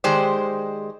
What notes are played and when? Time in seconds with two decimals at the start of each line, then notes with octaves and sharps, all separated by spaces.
0.04 D#3 G#3 G4 C5 D5